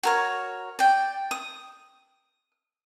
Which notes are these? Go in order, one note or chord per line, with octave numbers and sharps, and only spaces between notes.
F#4 A#4 C#5
D5 G5
D#6